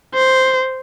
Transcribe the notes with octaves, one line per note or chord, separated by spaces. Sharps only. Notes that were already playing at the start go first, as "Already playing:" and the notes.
C5